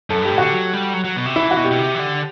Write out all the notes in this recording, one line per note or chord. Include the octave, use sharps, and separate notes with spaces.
F#2 A4
G2 G4
A2
D3 F#4
F#3
G3
F#3
F#3
B2
C3
E3 E4
F#4
B2
G4
B2
C3
E3
D3